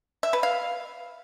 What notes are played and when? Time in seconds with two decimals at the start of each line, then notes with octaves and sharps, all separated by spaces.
0.23 E5
0.33 B4
0.43 F5